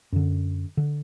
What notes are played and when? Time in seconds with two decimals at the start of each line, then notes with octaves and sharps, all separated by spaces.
0.12 F#2 D3
0.77 D3